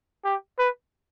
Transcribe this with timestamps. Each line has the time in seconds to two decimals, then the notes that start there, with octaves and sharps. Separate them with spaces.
0.25 G4
0.59 B4